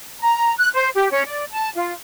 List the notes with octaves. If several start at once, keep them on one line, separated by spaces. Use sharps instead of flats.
A#5
F#6
C5
G4
C#4
D5
A5
F4